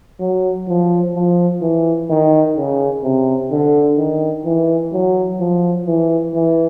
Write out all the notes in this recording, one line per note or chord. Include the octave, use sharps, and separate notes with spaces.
F#3
F3
F3
E3
D#3
C#3
C3
D3
D#3
E3
F#3
F3
E3
E3